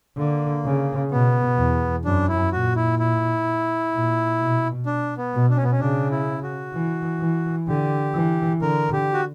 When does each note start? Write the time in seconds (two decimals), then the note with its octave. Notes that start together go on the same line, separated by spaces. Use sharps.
0.18 D3 A#3
0.65 C#3
1.11 B2 B3
1.58 E2
2.05 F#2 D4
2.28 E4
2.52 A#2 F#4
2.76 E4
2.99 E4
3.94 A#2
4.40 B2
4.86 D4
5.18 B3
5.34 B2
5.50 D4
5.57 C#4
5.64 B3
5.72 C#4
5.80 C#3 D4
6.11 E4
6.43 F#4
6.74 E3
7.21 E3
7.68 D3 G4
8.15 E3
8.62 D3 A#4
8.93 G4
9.14 F#4